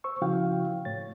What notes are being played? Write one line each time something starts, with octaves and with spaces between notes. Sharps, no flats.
C5 C#6 E6
C#3 F3 E4 F#4 F5 G5
A2 C#5 A6